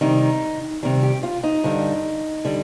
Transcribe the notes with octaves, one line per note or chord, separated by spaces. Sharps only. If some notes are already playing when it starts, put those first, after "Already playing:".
C3 D#3 G3 D#4
C3 D#3 G3
G4
F4
D#4
G2 D3 G3
D3 G3